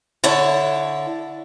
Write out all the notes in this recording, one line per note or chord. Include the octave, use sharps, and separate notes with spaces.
D3 E4 C#5 A5